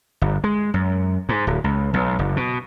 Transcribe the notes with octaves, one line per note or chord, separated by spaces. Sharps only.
G1
G#3
F#2
G#2
D1
C#2
B1
F#1
B2